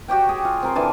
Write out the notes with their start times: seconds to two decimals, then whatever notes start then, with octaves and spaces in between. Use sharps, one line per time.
0.08 F#4 G4 C#5 G5
0.29 G#4
0.45 F4
0.63 C4 A#4 C5
0.75 D3 E3 G#5 A5